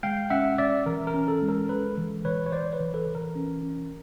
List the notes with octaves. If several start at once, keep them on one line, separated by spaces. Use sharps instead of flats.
G#3 F5 G5
C#4 E5 F#5
C#4 D5 E5
E3 A#4
A#4
C#4
A4
G#3
A#4
G#3 A4 B4
E3
E3 B4 C#5
C#5
E3 C5 D5
B4 C#5
E3
A4 B4
E3
A#4
C#4
C#4